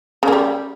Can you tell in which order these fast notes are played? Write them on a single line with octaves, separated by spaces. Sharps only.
C#3 A#3 G3